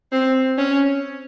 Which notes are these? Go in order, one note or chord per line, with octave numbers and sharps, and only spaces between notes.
C4
C#4